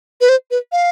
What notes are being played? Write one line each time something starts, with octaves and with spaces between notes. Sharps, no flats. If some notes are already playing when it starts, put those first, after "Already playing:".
B4
C5
B4
F5